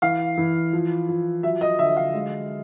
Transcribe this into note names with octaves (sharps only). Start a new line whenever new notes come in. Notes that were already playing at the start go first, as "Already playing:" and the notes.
E3 F5
E3
F3
F3
F#3 E5
D#5
D3 E5
F5
G#3